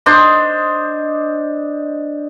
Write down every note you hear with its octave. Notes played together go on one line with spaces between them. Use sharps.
D4 C5 D#5